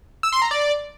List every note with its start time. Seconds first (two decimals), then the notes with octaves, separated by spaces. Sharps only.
0.23 E6
0.33 C6
0.42 A#5
0.51 D5